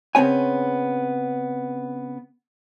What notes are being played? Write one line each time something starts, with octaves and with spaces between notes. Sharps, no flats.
C#3 B3 C4 C#5 G#5